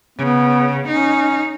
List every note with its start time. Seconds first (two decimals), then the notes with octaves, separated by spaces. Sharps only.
0.18 C#3 B3
0.88 C#4 D#4